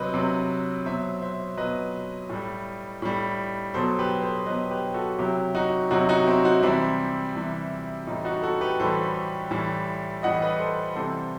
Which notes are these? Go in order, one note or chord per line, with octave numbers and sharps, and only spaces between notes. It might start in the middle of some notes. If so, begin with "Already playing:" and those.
Already playing: C3 F#3 B4 C5 D#5
C3 F#3
B2 F#3 C5 E5
C5 E5
B2 F#3 B4 D#5
A2 G3
A2 G3
B2 F#3 A4 C5
G4 B4
A4 C5
B2 F#3 B4 D#5
G4 B4
F#4 A4
C3 F#3 E4 G4
D#4 F#4
C3 F#3 D#4 F#4
D#4 F#4
C4 E4
D#4 F#4
C3 E3 G3 C4 E4
C3 E3 G3
A2 E3 G3 D#4
D#4 F#4
F#4 A4
G4 B4
A2 E3 G3 A4 C5
A2 E3 G3
A2 E3 G3 D#5 F#5
B4 D#5
A4 C5
C3 E3 G3 A4 C5